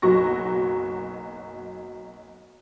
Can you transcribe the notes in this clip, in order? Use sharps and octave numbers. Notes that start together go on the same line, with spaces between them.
F#1 B1 F#3 F#4 C#6 A#6